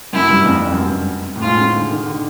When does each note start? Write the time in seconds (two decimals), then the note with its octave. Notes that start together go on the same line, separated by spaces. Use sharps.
0.13 F#2 E4
0.29 G2
0.45 F2
0.62 F2
0.72 F#2
0.77 G2
1.36 A2
1.42 G#2 F4
1.58 C#3
1.74 D3
1.90 D#3
2.06 D3